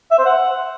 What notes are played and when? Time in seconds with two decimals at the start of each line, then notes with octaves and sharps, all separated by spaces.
0.11 E5
0.19 C5
0.26 F#5